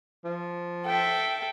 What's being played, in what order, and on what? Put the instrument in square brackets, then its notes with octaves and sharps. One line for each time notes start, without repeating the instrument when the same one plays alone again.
[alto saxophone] F3
[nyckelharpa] A4 E5 [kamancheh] G5